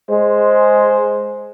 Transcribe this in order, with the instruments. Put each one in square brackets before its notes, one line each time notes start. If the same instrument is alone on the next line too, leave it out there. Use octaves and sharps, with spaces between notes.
[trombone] G#3 [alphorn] C5